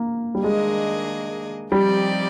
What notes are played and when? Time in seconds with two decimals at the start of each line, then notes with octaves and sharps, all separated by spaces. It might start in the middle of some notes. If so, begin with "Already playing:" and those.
Already playing: A#3
0.35 G3
0.44 D#3 G#3 A#3 D4 G#4 D#5
1.72 F3 G3 C4 D#4 G4 D5